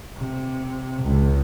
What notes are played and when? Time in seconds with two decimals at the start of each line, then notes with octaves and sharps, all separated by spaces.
0.16 C3
1.03 C#2